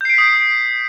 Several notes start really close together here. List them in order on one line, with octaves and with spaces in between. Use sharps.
G6 C7 D7 B6 D#6